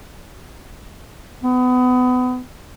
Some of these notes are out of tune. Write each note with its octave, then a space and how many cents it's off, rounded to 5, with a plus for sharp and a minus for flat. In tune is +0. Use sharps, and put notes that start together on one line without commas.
B3 +30